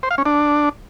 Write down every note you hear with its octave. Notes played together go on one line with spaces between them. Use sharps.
C5
F5
C#4
D4